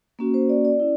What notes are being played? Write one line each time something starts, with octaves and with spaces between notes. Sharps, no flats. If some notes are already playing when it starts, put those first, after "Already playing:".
A#3 C#4 F#4
C5
D5
D5
C#4 E4